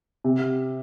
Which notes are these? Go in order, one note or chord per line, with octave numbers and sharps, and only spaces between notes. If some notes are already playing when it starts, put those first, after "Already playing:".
C3